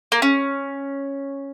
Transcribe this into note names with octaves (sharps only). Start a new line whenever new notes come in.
A#3
C#4